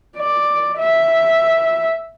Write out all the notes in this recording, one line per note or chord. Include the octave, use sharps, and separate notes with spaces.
D5
E5